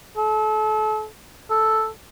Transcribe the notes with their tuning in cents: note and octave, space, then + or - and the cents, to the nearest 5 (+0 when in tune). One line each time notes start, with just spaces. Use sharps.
A4 -35
A4 +0